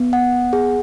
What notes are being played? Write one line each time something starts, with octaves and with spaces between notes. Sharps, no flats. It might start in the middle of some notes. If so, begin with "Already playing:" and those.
Already playing: B3
F#5
G#4